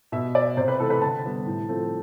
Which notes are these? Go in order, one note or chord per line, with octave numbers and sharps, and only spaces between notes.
B2 E5
B3 D5
C3 C5
B4
E3 A3 C4 A4
B4
D3 A5
G3 B3
A2
F3 A3 C4